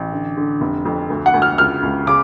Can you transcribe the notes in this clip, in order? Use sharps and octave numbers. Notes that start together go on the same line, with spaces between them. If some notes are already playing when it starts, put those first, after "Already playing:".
Already playing: A1
D3
D3
F1
F2
D2
F#5
D2
F6
C#2 F6
C#2
C#3 D6